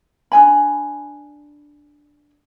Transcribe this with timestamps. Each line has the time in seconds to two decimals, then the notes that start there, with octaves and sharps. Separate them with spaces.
0.32 D4 D#4 G#5 B5